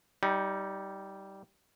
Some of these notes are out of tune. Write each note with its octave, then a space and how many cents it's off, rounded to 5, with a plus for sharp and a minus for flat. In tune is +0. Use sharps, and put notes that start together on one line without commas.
G3 -10 D#4 +20